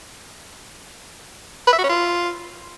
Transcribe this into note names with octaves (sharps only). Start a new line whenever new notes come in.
B4
E5
F#4
C#4
F4